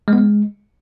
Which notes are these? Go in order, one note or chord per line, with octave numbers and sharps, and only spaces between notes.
G#3
B3
G#3